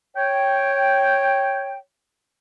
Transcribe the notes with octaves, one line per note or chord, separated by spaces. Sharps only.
C#5 G5